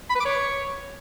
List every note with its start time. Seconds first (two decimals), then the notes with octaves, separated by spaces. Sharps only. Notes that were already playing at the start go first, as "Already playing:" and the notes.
0.10 B5
0.15 B4
0.20 D6
0.25 C#5